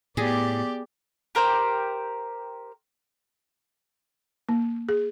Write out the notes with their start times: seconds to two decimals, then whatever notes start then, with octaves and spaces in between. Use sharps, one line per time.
0.17 A2 B3 G4 G#4 D5
1.35 G4 A#4 C5 G5
4.49 A#3
4.89 G#4